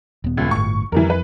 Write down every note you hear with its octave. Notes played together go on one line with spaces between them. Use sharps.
D#1 B3
F#1 C#2
G1 A2 C#6
F2 E3 G3 A#4
B4